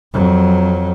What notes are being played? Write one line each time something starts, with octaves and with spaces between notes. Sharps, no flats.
F2 F#3